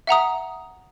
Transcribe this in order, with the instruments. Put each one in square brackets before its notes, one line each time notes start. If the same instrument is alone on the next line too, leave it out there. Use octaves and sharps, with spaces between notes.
[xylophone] E5 F#5 A#5 D#6